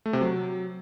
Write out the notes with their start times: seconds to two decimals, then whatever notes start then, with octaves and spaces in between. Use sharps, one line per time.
0.06 A3
0.13 C3
0.21 F#3